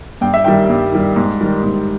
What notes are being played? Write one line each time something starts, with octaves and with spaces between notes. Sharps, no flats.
G2 G5
E5
D#3 G3 G5
G2
D#3 G3
G#2
D#3 G3
G#2